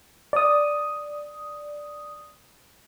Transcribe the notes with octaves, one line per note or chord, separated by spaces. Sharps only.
D5 D#6